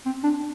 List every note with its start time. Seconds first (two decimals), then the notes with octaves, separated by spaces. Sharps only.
0.06 C4
0.23 D4